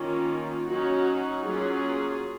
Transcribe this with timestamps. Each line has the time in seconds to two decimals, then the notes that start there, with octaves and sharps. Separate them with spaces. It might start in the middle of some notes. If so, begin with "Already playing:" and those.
Already playing: D#3 A#3 C#4 F4
0.67 F#3 C#4 D#4 F#4
1.45 F#3 A#3 C#4 F4 G#4